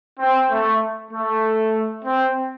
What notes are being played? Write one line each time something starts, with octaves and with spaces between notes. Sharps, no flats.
C4
A3
A3
C4